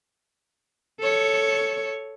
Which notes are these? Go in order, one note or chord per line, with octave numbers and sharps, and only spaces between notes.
A4 C#5